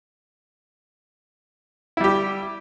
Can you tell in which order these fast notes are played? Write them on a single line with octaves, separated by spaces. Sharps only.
E4 G3 G4